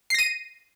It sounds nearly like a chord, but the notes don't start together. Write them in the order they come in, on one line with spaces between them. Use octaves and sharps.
C7 A#6 D#7